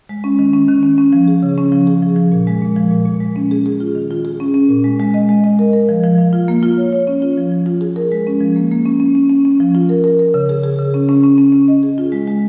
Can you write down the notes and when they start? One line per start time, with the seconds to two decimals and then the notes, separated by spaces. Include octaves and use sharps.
0.09 G#3
0.24 C#4
0.39 D#3
0.53 C#4
0.68 D#3
0.83 C#4
0.98 C#4
1.13 F3
1.28 G#4
1.43 C#3
1.58 C#4
1.72 F3
1.87 G#4
2.02 F3
2.16 F3
2.32 A#2
2.47 G#3
2.62 A#2
2.76 F3
2.91 A#2
3.06 A#2
3.20 G#3
3.36 C#4
3.51 G#4
3.66 G#4
3.80 F4
3.95 D#3
4.11 F4
4.25 G#4
4.40 C#4
4.54 C#4
4.69 A#2
4.84 G#3
4.99 G#3
5.14 D#5
5.29 G#3
5.44 D#5
5.59 A#4
5.73 A#4
5.89 F3
6.04 F3
6.18 F5
6.33 F4
6.48 A#3
6.63 F4
6.77 C#5
6.92 C#5
7.07 C#4
7.22 F4
7.38 F3
7.52 F3
7.66 F4
7.81 G#4
7.96 A#4
8.12 G#3
8.27 C#4
8.41 F3
8.56 A#3
8.71 A#3
8.86 C#4
9.00 C#4
9.15 C#4
9.30 C#4
9.45 C#4
9.60 F3
9.75 F4
9.89 A#4
10.04 A#4
10.19 A#4
10.34 C#3
10.49 G#4
10.64 G#4
10.79 C#3
10.94 C#4
11.09 C#4
11.23 C#4
11.38 C#4
11.53 C#4
11.68 D#5
11.83 G#4
11.98 F4
12.12 G#3
12.27 G#3